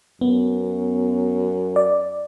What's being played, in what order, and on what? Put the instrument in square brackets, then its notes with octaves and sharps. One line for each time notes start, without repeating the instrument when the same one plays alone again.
[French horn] F#2 [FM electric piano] B3
[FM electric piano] D5